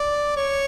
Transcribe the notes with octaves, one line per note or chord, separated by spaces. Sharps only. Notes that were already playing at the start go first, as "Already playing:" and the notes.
Already playing: D5
C#5